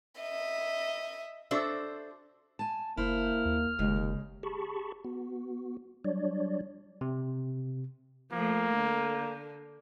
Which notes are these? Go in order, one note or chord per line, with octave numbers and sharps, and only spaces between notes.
D#5 E5
D4 F#4 A4 C5 E5
G#5 A5
F#1 A#3 E4 C5 F6
D#2
F1 D#2 C#3 G#3
G4 G#4 A5 B5 C#6
B3 F#4
F#3 G3 D4 C#5 D5
C3
F3 A3 A#3
D3